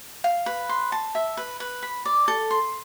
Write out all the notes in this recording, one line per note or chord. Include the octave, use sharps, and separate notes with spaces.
F5
B4
C6
A5
E5
B4
B4
B5
D5
A4
C6